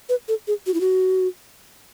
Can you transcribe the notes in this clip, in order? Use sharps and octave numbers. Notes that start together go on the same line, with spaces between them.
B4
A4
G#4
F#4
E4
F#4